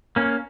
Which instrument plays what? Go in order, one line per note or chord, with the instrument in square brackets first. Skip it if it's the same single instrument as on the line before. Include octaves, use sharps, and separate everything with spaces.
[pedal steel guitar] A#3 C#4